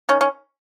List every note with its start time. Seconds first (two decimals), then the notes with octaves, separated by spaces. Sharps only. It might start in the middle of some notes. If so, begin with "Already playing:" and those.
0.09 D#3 C#4
0.21 C#4